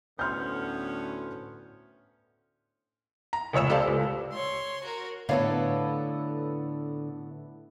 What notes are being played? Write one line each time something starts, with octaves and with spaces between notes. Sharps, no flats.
D2 A2 B3 C#4 C6 F6 G6
A#5
F1 C#2 C#5 E6 E7
G4 A4 C5 D5 F5 A5
C#2
C#5 C6
F#4 A#4
A2 D3 B3 A4 C#5 F5